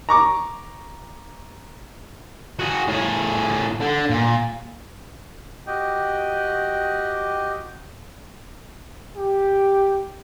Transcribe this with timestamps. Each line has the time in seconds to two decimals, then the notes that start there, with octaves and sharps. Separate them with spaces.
0.09 A#5 C#6 D6
2.59 F#4 G#4
2.88 A2 G#4
3.80 D3
4.10 A#2
5.67 F#4 G4 D#5 G5
9.16 G4